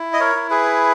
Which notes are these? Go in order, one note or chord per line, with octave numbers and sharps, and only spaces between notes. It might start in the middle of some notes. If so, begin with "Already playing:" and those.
Already playing: E4
D#5
A#4 C#5
E4
G#4 B4